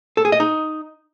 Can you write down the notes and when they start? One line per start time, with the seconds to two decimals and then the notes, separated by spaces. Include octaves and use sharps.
0.17 A4
0.25 G#4
0.32 D#5
0.40 D#4